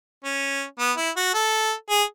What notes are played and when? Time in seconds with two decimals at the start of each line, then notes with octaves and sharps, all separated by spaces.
0.24 C#4
0.79 B3
0.97 E4
1.16 F#4
1.34 A4
1.90 G#4